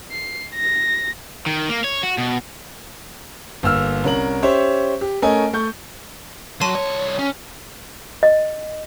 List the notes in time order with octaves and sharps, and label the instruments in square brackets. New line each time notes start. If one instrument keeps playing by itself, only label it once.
[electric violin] C7
A#6
[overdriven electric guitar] D#3
A#3
C#5
F#4
B2
[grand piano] G1 A#3 E6 F6
C2 C#4 A#4 F#7
C#4 G4 C5 C#5 E5
G4
A3 C#4 A#4 D#5 G#5
A3 C#6 G6
[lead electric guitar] F#3 [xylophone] A5 C6 D#7
[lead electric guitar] C2 C#5
C#4
[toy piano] D#5